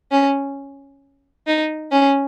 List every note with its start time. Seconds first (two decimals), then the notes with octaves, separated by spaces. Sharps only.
0.11 C#4
1.47 D#4
1.92 C#4